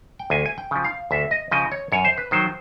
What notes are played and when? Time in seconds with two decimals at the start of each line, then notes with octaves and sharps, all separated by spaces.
0.19 G5
0.30 D2 G#5
0.46 G#5
0.58 G5
0.71 C#3 F3
0.84 F5
1.11 D2 E5
1.31 D#5
1.51 C#3 F3 D#5
1.72 C#5
1.92 F#2 C#5
2.05 C5
2.18 B4
2.31 D#3 F#3 C5